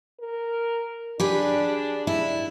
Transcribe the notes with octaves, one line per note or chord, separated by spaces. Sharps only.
A#4
D4 G4 G#4 B4
E4